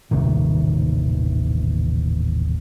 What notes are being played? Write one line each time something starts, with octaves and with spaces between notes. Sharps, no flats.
D#1 A1 C3 D#3